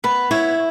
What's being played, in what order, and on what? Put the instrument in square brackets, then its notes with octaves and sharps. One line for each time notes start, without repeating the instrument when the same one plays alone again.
[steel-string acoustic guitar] B3 [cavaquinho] B4
[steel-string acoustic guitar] E4 [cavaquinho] C#5